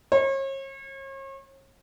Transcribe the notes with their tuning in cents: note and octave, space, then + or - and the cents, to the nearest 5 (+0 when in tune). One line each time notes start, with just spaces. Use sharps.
C#5 -40